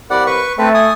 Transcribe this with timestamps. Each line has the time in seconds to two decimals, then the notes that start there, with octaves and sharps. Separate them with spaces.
0.10 C2 A#4 D5 F#5 B5
0.27 B4 C#6
0.58 A3 C4 B4 A5
0.74 G#5 D#6